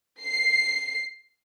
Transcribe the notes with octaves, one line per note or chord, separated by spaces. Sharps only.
C7